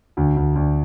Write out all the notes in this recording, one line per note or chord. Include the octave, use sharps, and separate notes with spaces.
D2
D2
D2